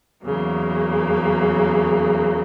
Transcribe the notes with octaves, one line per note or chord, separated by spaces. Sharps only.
E2 C#3 F#3 A#3